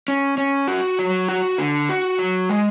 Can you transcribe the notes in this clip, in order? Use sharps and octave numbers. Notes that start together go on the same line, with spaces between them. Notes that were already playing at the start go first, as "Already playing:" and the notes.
C#4
C#4
F#4
F#3
F#4
D3
F#4
F#3
G#3